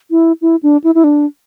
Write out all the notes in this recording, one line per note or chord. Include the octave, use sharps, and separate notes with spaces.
E4
E4
D4
E4
E4
D4